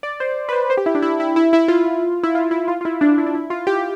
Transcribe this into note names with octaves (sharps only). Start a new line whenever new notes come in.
D5
C5
B4
C5
C5
G4
E4
D4
E4
E4
E4
E4
F4
E4
F4
E4
F4
F4
E4
D4
E4
D4
E4
F4
G4